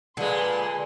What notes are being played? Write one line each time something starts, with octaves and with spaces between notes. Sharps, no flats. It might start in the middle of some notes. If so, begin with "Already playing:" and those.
A#2 D3 G#3 B4 C6